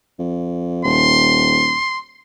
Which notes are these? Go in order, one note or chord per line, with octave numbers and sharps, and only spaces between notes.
F2
D#1 C6